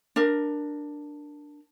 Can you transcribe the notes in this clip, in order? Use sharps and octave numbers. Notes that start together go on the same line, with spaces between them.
D4 A#4